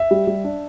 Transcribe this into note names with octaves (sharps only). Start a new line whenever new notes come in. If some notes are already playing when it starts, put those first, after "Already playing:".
Already playing: E5
G3
G3
D4